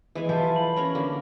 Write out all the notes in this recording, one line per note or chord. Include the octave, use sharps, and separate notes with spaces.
E3 G#3 G#5
F3 E4 F4 G4 A4
B5
C#4 A#4 C#5
D3 A#3